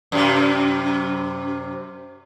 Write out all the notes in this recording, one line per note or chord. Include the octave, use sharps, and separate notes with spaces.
F#2 C3